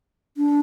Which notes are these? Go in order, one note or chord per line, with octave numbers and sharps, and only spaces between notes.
D4